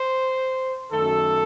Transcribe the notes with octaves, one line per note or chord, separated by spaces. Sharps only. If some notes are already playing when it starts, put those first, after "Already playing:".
Already playing: C5
F#2 D#3 A3 A4